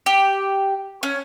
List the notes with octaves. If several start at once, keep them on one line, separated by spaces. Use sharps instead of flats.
G4
C#4